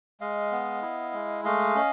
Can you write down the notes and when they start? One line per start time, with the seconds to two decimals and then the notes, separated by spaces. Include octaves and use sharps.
0.20 G#3 D#5 F5
0.51 B3
0.82 E4
1.13 G#3
1.45 A3 D#5 F5
1.75 C#4